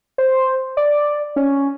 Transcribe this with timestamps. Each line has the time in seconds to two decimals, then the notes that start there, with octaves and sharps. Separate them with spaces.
0.18 C5
0.77 D5
1.36 C#4